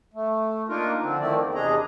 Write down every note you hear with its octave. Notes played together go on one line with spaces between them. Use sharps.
A3
A#3 D4 D#4 F4 A#4
D3 F3 C4
D#3 F3 A3 C4 E4 D5
E2
E2 C3 D4 G#4 D#5 A#5